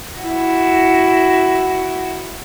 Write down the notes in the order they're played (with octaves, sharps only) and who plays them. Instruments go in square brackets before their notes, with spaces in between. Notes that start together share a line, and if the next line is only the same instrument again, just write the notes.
[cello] E4 F#4